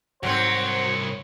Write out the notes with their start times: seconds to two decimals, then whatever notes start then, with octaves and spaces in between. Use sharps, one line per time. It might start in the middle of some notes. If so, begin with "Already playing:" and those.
0.23 C2 G#2 F#3 C4 C5 C#5